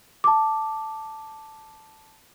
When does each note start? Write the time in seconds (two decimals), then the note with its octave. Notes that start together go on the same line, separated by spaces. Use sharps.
0.24 A5 D6